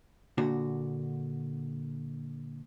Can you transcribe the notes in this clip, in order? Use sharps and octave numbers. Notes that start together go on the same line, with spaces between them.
A#2 D3 F#4